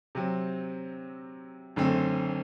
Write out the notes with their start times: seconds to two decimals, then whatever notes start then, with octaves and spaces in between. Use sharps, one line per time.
0.15 C3 F#3 C4
1.76 F#1 F#2 D3 A3 C4